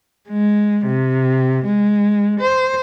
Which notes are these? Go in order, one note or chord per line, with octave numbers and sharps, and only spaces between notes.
G#3
C3
G#3
C5